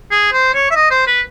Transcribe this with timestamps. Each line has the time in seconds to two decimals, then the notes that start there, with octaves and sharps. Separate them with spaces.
0.11 G#4
0.33 C5
0.54 C#5
0.71 E5
0.75 D#5
0.91 C5
1.07 B4